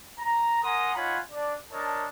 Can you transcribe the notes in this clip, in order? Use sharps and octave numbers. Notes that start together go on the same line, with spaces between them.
A#5
A#4 F#5 G#5 A#5 C6 D#6
D#4 F4 C#5 F#5 G#5 B5
D4 D5
D4 A#4 C#5 D#5 A5